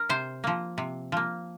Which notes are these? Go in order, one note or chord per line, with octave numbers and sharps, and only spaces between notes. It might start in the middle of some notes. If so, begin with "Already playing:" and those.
Already playing: A#4
C3 C5
F3 A#3
C3
F3 A#3